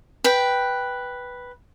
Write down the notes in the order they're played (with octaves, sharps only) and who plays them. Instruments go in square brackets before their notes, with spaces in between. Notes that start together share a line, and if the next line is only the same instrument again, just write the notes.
[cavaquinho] B4 G5